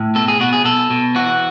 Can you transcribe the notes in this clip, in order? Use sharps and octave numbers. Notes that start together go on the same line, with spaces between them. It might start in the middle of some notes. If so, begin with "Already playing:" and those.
Already playing: A2
B2 A4
G#4
B2 F#4
G#4
B2 A4
B2
E3 F#4